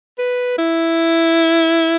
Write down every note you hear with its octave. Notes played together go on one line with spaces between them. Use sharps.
B4
E4